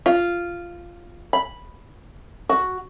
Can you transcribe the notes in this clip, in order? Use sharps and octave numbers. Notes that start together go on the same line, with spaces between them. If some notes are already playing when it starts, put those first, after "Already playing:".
F4
B5
F#4